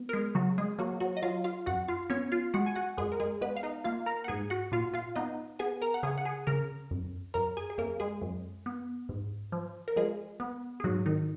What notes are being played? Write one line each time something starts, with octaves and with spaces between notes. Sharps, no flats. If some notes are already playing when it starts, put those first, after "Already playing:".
Already playing: B3
A#4
G#3 G#4
C#3 F#3 F#4
G#3 G#4
F#3 A#3 F#4
F#3 F#4
D#5
F#3 F4 F5
F4 F5
F#2 F#4 F#5
F4 F5
B3 C#4 C#5
F4 F5
G#3 F#4 F#5
G#5
F#4 F#5
F#2 G#3 G#4
A#4
G#3 G#4
G#3 B3 B4
F5
D#4 D#5
A#3 F4 F5
A#4 A#5
F#5
G#2 G#4 G#5
F#4 F#5
A#2 F4 F5
F4 F5
B3 D#4 D#5
B3 G#4 G#5
A#4 A#5
F#5
C#3 G#4 G#5
F#5
G#4 G#5
C#3 A#4 A#5
F#2
F#2 A#4 A#5
G#4 G#5
G#4
F#2 A#3 A#4
G#3 G#4
F#2
B3
G#2
F3
A#4
F3 G#3 G#4
B3
G#4
G#2 F#3 F#4
D#3 D#4